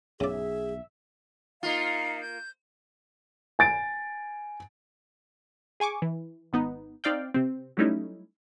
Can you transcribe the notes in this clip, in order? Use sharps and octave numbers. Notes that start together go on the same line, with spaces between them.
B1 C#3 G#4 D5 E5
A#3 D#4 F4 F5 A#5
G6
G#5 A6 D7
G#4 G#5 C#6 D6
E3
G#1 B3 D#4
C4 D#4 D5 F5 G5
C3 C4
F#3 G3 A3 C#4 D#4 E4